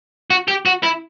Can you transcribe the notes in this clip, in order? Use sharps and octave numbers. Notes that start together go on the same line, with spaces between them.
F#4
G4
F#4
E4